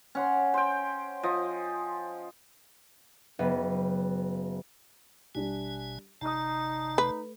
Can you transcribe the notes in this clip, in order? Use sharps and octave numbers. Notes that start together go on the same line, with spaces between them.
C#4 F#5 C6
C5 G5
F3 D#5
F#1 B3
A1 B2 G3 D4 G4 G#5
G1 C3 D#4 A5 A#5 D#6
A3 B4